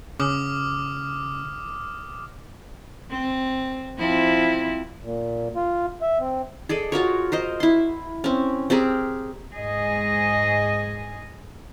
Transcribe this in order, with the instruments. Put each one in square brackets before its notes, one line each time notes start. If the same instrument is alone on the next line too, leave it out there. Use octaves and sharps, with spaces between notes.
[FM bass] C#3 [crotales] D6 D#6 F6
[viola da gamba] C4
F3 C4 E4
[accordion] A#2
F4
E5
C4
[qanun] G#4 A4 D5 D#5
F4 F#4 A#4 C#5
A#4 C5 D#5
E4 C6
C4 C#4
C4 G4 G#4 A#4
[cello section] G#2 G#4 D#5